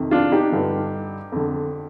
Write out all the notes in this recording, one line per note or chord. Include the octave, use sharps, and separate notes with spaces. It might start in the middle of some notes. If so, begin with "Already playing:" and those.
Already playing: F2 C3 D#3
D4 F4
D#4 G4
G2 D3
F2 D3